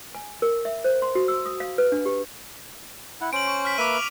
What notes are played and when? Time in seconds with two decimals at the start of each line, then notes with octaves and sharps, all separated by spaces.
0.15 G#5
0.42 A#4
0.65 E5
0.84 C5
1.02 C6
1.15 F#4
1.28 E6
1.46 D#6
1.60 F5
1.78 B4
1.92 D4
2.06 G4
3.21 E4 F#5
3.33 C#4 C5 D7 F#7
3.47 C#6
3.65 F6 B6
3.78 A#3 B4 E5 D6 B6 D#7
3.94 F7